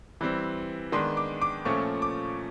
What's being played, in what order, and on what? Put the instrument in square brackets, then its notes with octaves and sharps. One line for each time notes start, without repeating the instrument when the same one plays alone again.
[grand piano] E3 G3 C4
D#3 G#3 B3 D4 C6
D6
D6
A#2 F3 A3 C#4 C#6
D6